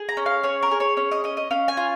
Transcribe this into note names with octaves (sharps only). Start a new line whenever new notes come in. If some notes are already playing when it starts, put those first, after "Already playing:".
Already playing: G#4
A#5
C#4
F5
G#4 C#5
A#4
G#4
C#5
C#4 C#5
D#5
C#4 D#5
D#5
C#4 F5
G#5
F4